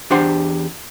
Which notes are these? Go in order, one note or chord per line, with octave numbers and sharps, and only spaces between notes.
E2 D4 G4 C5 F#5 C6